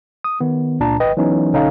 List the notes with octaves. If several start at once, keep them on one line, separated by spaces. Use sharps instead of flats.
D#6
D#3 B3
C#2 A#2 D4 A5 A#5
G#1 B4 D#5 G5
E3 F#3 B3 C#4 D#4
B1 D3 C#4 D#4 A4 F5